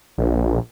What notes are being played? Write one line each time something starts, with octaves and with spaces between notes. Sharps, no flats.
A#1